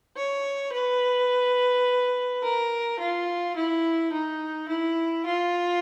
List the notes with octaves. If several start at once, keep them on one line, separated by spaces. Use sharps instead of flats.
C#5
B4
A#4
F4
E4
D#4
E4
F4